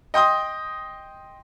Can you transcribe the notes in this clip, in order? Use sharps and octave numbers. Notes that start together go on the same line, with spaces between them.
D#5 G5 C6 D#6